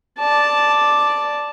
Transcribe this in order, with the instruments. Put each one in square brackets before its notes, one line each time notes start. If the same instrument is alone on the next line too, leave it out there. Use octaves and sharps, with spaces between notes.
[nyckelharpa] D5 A5